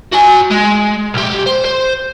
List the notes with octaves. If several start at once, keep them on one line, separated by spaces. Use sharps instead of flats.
F#4 G#5
G#3
B1 G4
C5
C5